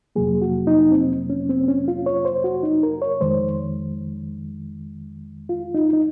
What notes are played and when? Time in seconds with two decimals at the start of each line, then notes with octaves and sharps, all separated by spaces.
0.16 F2 C3 F#3 A#3 G#4
0.41 F#4
0.67 D#4
0.92 C4
1.30 C#4
1.49 C4
1.68 C#4
1.88 F4
2.06 C#5
2.25 C5
2.44 F#4
2.63 D#4
2.83 A#4
3.02 C#5
3.21 F2 D#3 G#3 C5
5.49 F4
5.74 D#4
5.93 D#4